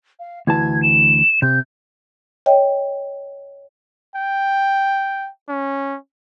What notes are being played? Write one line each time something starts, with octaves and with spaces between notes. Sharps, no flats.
F5
D2 E3 A5 G#6
E7
C3 G6
C#5 D#5 G5
G5
C#4